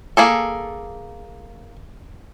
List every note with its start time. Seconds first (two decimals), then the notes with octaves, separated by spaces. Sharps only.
0.17 A#3 G#4 A4